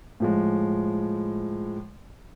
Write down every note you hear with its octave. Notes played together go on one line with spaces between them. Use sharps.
A2 F3 G#3